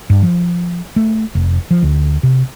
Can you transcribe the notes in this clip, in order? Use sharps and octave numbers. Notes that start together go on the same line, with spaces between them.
G2
F3
A3
F1
F3
D2
C3